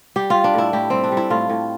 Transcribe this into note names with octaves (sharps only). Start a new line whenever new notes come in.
G3 G4
G3 F4
D4
A2 E4
A2 G4
G3 C4
D4
G3
E4
A2 F4
A2